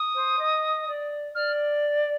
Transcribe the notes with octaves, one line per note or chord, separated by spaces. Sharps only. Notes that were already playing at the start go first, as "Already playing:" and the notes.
Already playing: D#6
C5
D#5
D5
D5 F6